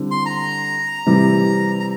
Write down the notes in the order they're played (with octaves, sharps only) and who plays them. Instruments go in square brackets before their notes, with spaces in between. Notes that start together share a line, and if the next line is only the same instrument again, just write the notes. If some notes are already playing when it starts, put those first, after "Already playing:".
Already playing: [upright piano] D3 G3 C4 E4
[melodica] C6
A#5
[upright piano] C3 E3 G3
[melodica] A#5